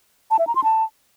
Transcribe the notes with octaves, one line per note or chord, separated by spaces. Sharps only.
A5
E5
A#5
C6
A5